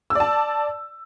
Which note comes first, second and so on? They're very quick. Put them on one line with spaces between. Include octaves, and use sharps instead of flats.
E6 D5 A5